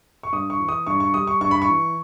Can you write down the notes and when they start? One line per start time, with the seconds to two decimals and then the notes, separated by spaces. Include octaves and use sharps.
0.23 C#6
0.33 G2 D#6
0.50 C#6
0.60 E3
0.69 D#6
0.87 G2 C#6
1.00 C#6
1.14 G3 D#6
1.27 C#6
1.41 G2 C#6
1.51 B5
1.62 C#6
1.69 E3